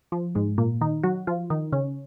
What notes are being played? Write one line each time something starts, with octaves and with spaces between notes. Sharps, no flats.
F3
G#2 G#3
A#2 A#3
D#3 D#4
F#3 F#4
F3 F4
D#3 D#4
C#3 C#4